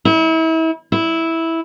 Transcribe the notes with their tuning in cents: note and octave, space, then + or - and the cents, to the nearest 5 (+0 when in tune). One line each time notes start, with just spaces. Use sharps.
E4 -35
E4 -10